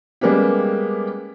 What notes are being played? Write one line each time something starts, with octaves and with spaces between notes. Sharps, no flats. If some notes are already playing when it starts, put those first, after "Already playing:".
G3 G#3 A#3 B3 C#4 G4